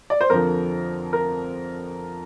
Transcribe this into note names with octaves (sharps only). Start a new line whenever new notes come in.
D5
C5
F2 D3 F3 A#4
A#4